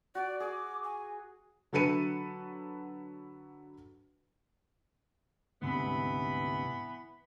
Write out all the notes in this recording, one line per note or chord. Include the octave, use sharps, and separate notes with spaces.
F#4 D5
G#4 D6
G#5
D3 F#3 A4 B4 C#7 D#7
D2 G#2 C3 E3 B3 B5